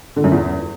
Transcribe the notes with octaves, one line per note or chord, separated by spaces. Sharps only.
D3
F#2
E2